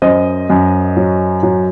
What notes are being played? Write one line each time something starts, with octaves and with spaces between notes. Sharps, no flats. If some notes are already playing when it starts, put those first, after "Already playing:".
F#2 C5 D#5
F#2
F#3
F#3